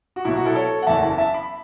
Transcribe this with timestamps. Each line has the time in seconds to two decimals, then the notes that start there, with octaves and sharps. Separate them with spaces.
0.16 F#4
0.25 B1 B2 F#3 E4
0.36 F#4
0.45 E4 A4
0.55 A4 C#5
0.82 F#5
0.87 F#1 E2 E3 E5 A5
1.02 E5 A5
1.18 E5 A5
1.34 B5